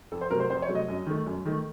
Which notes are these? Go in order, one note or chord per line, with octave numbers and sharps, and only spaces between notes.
F2 A4
C5
C3 F#3 A3 A#4
C5
F2 C5
C#5
C3 F#3 A3
D#5
F#2
D#3 A3
F#2
D#3 A3